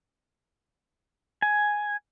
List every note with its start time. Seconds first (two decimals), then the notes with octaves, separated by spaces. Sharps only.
1.42 G#5